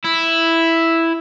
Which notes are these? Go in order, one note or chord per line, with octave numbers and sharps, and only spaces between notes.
E4